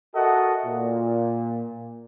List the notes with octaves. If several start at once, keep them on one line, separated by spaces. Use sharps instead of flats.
F#4 A4 A#4 D#5 E5 F#5
A#2